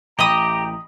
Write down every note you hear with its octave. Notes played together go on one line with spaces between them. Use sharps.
A1 G4 D#5 A#5 B5 D#6